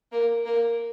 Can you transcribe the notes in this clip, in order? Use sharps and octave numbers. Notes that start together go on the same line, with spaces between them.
A#3
A#3